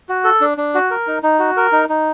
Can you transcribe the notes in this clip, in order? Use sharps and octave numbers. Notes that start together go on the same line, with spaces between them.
F#4
A4
D4
D4
F#4
A#4
D#4
D#4
F#4
A#4
D#4
D#4